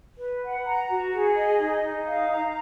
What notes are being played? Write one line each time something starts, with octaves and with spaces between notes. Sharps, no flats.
B4
F#5
A#5
F#4
G#4
D#5
D#4
D#4
F5
A#5